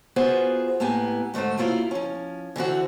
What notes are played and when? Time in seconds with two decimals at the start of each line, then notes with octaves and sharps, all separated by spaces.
0.16 B3 F4 F#4 G#4 B4 C5
0.80 A2 A#3 B3 G4 G#5
1.34 G#2 D3 A3 C4 C5
1.57 F#3 A#3 E4 F4 F5
1.91 F3 C#4
2.56 D3 E3 C4 F#4